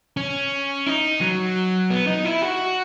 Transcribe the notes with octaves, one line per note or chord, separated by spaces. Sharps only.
C#4
D#4
F#3
B3
D#4
E4
F#4